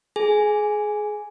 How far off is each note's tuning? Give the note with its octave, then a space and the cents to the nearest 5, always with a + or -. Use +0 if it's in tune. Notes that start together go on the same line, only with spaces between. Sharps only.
G#4 +25 G#5 +0